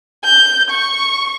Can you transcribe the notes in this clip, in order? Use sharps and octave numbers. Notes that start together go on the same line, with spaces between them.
G6
C#6